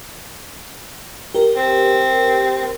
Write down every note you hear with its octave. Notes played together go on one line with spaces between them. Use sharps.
G4 A#4
C4